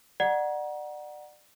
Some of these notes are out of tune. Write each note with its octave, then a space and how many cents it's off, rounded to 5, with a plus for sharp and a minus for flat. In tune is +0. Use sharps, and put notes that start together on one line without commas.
D5 +25 F#5 +0 A#5 +30